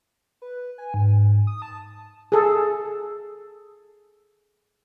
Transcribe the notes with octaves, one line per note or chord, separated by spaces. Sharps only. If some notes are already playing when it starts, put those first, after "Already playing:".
B4
G#5
G#2
D#6
A5
G#4 A4